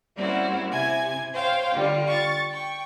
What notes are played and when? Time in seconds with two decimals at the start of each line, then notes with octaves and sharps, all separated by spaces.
0.16 G3 A#3 C4 C#4 E4 F#4
0.71 C3 E4 G#5 G#6
1.33 C5 C#5 F5 G5
1.72 D3 G3 F4
2.07 C#6 A6
2.50 G5 C#6